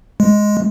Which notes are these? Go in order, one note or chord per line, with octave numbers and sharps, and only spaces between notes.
G#3